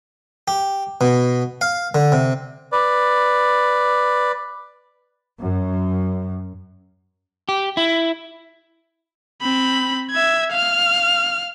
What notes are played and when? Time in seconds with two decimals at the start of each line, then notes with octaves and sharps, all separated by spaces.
0.48 G4
1.01 B2
1.61 F5
1.95 D3
2.12 C3
2.72 B4 D5
5.37 F#2
7.49 G4
7.77 E4
9.41 C4 B5
10.11 E5 G#6
10.52 F5 F6